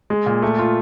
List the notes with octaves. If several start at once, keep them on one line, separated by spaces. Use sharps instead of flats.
G#3
A#2
A3
F4